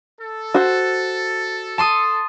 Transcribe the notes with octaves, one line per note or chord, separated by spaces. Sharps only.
A4
F#4 C5
A5 C6 D#6